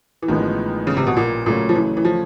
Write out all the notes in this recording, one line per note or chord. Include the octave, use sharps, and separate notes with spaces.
E3
A1 A2 D#3 F3 G#3 B3
C#3
C3
B2
A#2
A#2 C#3 F#3 A3 C#4
F3
E3
E3
F3